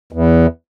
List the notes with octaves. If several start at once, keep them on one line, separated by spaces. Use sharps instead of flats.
E2